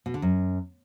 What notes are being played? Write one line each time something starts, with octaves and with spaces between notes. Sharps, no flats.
B2
D3
F#2